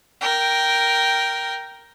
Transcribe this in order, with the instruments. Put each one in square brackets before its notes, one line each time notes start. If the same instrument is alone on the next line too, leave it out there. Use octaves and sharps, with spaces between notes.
[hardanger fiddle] A#4 G5